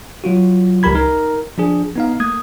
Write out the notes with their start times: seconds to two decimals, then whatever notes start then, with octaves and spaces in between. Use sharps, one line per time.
0.24 F#3 F4 F#4
0.83 C#2 F3 G4 A#4 B5 G#6
0.95 D#4 A#4
1.58 F3 D4 G#4
1.96 B3 D#4 F5
2.20 A3 A#3 D#6 G#6